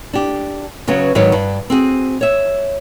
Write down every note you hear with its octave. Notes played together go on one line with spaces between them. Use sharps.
D4 G4
C#3 F#3 B3 C#4
G#2 D#3 F#3 G3 B3 C#5
G2
C4 F#4 G#4
C#5 E5